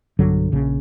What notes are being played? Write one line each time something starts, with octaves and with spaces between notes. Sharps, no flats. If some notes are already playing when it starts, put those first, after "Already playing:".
B1 G2 D3 F#3
A#1 C#3